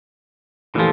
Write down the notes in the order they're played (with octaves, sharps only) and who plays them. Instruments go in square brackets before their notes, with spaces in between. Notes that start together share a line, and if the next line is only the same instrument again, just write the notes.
[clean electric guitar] A#2 F3 [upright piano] E3 A3 G4